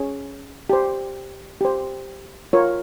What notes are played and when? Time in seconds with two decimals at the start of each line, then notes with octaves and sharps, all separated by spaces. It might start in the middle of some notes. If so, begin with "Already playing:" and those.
Already playing: C#4 G#4 C#5
0.70 G4 C5
1.61 G4 C5
2.53 F4 A#4 C#5